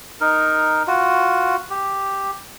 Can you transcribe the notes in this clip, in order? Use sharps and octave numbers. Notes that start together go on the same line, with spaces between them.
D#4 A#4
F4 F#4
G4